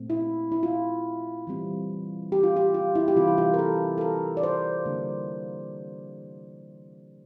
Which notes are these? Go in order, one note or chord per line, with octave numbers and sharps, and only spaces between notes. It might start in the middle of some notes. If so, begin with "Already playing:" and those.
Already playing: A#2 A3 C4
E4
E4
F4
E3 G3 C4
G4
F4
G4
F4
E4
G4
C3 E3 G3 C4 F4
E4
F4
A#4
A4
A4
A#4
D5
C5
D3 G3 A#3 D4